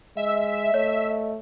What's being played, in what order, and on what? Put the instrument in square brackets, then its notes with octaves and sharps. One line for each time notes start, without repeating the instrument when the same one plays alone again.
[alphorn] G#3 [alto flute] D#5 [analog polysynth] E5
[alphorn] A3 [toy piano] C#5